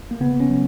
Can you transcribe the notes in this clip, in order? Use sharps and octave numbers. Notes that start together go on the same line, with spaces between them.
A#3
C#3 B3
C#4
F#3